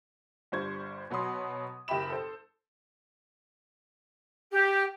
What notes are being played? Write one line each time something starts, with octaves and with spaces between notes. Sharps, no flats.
G1 G3 D4 C5 C#6 G#6
B2 F#3 C#5 B5 C6 D#6
F#1 G4 E5 G5 B5 E7
A4 C5
G4